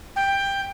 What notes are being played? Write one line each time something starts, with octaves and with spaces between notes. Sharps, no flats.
G5